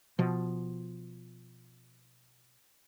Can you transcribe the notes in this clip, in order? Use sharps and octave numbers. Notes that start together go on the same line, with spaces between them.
B2 F3